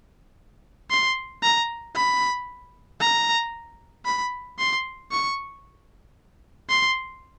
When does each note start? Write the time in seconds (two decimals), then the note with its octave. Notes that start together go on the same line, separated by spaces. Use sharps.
0.90 C6
1.43 A#5
1.96 B5
3.01 A#5
4.05 B5
4.59 C6
5.11 C#6
6.69 C6